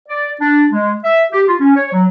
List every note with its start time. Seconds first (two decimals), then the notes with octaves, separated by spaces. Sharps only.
0.09 D5
0.41 D4
0.72 G#3
1.04 E5
1.32 G4
1.48 F4
1.61 C#4
1.76 C#5
1.93 F#3